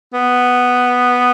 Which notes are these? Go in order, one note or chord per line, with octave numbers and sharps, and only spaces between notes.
B3